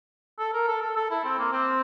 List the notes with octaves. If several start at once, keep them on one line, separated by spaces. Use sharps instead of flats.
A4
A#4
A4
A4
A4
E4
C4
A#3
C4